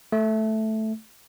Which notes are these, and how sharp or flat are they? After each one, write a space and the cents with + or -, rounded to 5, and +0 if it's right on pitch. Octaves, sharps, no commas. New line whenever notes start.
A3 -5